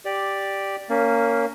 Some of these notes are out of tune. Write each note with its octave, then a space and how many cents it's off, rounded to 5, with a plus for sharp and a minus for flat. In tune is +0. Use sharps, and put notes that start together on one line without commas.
G4 +0 D5 +0
A#3 -10 C#4 +15